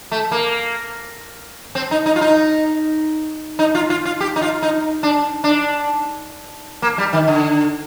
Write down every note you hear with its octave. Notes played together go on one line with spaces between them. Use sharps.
A3
A#3
C4
D#4
D#4
F4
D#4
D#4
F4
F4
F4
G4
D#4
F4
D#4
D4
D4
A#3
G3
D#3
D3